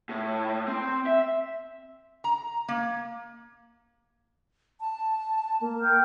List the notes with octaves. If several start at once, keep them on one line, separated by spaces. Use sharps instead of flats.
A2
C4
E5
A#5
A#3
A5
A#3
G5 F6 G6